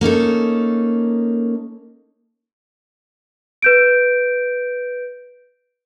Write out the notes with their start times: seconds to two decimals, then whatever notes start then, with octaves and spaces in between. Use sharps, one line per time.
0.01 A#3 C#4 D#4 A4
3.62 B4 G6 D7